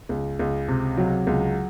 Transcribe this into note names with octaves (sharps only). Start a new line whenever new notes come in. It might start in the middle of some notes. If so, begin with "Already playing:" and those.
C#2
C#2
C3
F#3
C#2